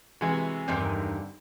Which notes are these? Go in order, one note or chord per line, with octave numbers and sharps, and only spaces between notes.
C3 E3 G#3 F#4 G#5
E2 G2 D3 D#3 C4